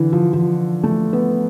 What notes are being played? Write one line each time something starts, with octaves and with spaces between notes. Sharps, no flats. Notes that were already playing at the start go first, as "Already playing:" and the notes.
Already playing: D3 E3
F3
F3
A3
B3